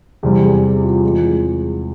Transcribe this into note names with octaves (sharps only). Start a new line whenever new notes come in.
E2 C3 G3 C4 G4
G#4
G4
E4
F4
E2 E3 G#3 C4 F4